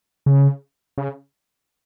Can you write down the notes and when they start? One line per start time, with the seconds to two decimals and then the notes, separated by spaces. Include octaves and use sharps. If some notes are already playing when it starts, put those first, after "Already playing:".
0.26 C#3
0.98 C#3